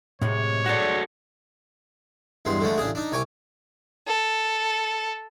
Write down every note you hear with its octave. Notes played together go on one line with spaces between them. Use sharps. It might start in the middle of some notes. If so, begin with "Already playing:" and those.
F#2 A2 C3 G#3 C#5
G2 G#3 F#4 A4 D5
E2 G2 G#3 C6
D3 F3 G#3 A3
A1 C#3 D4 G#4
D4 D#4
C2 C#5 G#5 D6
A4